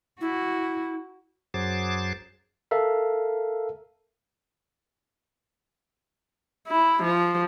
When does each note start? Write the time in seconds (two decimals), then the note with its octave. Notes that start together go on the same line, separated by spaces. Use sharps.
0.21 E4 F#4
1.54 F#2 F#3 G#4 C5 D6 A6
2.71 A4 A#4 E5 F5
6.68 E4
7.03 F3